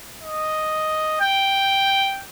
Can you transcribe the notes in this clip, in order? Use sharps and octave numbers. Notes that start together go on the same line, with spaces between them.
D#5
G5